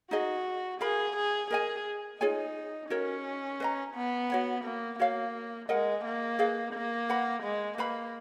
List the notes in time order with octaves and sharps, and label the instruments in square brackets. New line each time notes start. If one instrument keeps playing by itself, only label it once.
[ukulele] D#4 G#4 D#5 [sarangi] F#4
[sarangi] G#4 [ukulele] A#4 F5 B5
[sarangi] G#4
[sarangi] G#4 [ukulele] A#4 D#5 G#5
[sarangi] D#4 [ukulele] F4 G#4 C#5 G#5
[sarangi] C#4 [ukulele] F#4 A#4 C#5
[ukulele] B4 D#5 A#5
[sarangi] B3
[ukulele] F#4 C#5 F#5
[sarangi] A#3
[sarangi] A#3 [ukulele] F#4 C#5 F5
[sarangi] G#3 [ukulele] A#4 D#5 F#5
[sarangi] A#3
[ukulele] G#4 B4 F5
[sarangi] A#3
[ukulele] B4 F#5 B5
[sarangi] G#3
[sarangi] A#3 [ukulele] B4 F5 B5